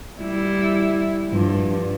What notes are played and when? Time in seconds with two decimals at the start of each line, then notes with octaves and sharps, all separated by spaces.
0.19 G3 E4
1.29 G2 F3